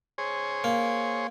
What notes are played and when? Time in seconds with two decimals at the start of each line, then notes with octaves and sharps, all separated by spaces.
0.18 G#4 C5 C#5
0.64 A#3